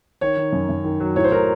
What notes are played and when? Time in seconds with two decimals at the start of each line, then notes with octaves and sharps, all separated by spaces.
0.21 D#3 C#5
0.37 D#3
0.52 F#2
0.69 F#2
0.84 D#3
1.00 F#3
1.16 A2 C#5
1.24 C5
1.31 A2 A#4